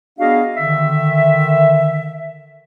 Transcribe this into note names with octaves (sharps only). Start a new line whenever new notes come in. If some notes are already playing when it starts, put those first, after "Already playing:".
B3 D4 F#4 G#4 D#5 F5
D3 D#3 E5